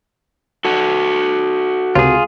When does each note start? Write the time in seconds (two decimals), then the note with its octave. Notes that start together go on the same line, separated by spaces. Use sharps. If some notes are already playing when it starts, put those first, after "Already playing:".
0.65 F#4 A4
1.95 C#2 C3 F4 G#4